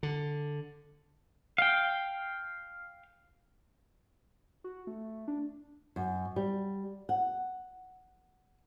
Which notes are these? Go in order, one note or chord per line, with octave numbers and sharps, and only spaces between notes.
D3
F5 G5
F#4
A3
D4
F#2
G3
F#5